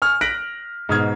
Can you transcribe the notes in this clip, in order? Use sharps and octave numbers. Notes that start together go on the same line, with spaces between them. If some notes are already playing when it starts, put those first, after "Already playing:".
G#5 C#6 F6
F#6 A#6 B6 D7 F#7
G#2 B2 D#6 F6 G#6